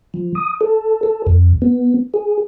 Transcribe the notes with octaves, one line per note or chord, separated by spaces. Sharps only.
F3
D#6
A4
A4
F2
B3
G#4